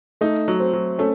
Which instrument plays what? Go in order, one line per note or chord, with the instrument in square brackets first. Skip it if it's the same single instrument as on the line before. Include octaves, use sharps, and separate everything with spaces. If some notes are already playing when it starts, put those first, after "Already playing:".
[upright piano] A3 [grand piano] D#4
[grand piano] F#3
[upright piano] C4
[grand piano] F#3
[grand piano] A3 [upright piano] C#4